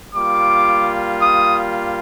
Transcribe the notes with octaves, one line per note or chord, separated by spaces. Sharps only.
G3 A#3 F4 D6
D#6